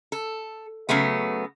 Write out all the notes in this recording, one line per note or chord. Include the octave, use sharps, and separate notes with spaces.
A4
C#3 F#3 A3 B3